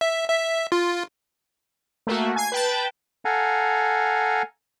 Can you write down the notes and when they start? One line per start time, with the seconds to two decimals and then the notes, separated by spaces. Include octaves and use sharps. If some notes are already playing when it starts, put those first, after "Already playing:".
0.01 E5
0.29 E5
0.72 F4
2.07 A3 A#3 F#4
2.36 G#5 G#6 C7
2.52 B4 G5 A5
3.25 A4 F5 F#5 G#5 A#5